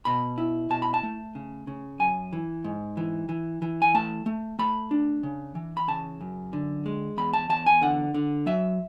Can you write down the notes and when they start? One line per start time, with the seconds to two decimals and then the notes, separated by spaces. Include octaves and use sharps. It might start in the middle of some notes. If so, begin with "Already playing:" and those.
0.05 B2 B5
0.38 E4
0.70 B2 A5
0.82 B5
0.94 A5
1.03 A3
1.35 C#3
1.67 C#3
2.00 F#2 G#5
2.33 E3
2.64 G#2
2.97 E3
3.29 E3
3.62 E3
3.82 G#5
3.95 A3 A5
4.26 A3
4.59 A3 B5
4.91 D4
5.23 C#3
5.55 E3
5.77 B5
5.88 C#3 A5
6.21 F#2
6.53 D3
6.86 G#3
7.17 E2 B5
7.33 A5
7.49 E2 A5
7.66 G#5
7.81 D3 F#5
8.14 D3
8.46 F#3 E5